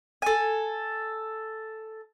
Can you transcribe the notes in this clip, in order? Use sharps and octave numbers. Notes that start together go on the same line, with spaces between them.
A4 G#5